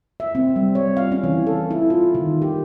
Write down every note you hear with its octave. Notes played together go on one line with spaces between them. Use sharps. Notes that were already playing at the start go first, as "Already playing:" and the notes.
E5
C4
G3
C#5
F5
C#4
E3
A4
E4
F4
D#3
G4